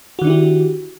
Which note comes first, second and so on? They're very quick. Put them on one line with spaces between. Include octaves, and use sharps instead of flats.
F#4 D#3 D4 E4 G4